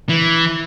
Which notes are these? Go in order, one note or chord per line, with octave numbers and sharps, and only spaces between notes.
E3